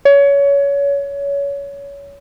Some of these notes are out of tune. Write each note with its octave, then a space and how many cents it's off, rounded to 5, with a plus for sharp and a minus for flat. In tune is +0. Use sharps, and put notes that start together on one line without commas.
C#5 +25